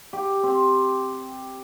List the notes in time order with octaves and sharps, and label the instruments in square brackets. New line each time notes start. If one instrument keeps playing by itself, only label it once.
[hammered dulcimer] G4
C4